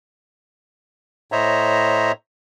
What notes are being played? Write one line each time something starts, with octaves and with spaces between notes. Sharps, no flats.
A2 C5 C#5 D#5 E5 A#5